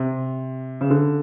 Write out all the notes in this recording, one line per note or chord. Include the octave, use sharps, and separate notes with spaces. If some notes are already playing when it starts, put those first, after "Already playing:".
Already playing: C3
C#3
D3